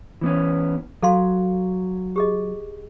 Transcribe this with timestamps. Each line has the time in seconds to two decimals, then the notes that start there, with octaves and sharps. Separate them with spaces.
0.21 E3 B3 C#4
1.03 F#3 A4 F5 C6
2.16 G4 G#4 D#5